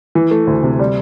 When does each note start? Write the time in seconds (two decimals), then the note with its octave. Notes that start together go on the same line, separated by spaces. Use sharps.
0.15 E3
0.31 A3
0.47 D2
0.63 C3
0.79 G3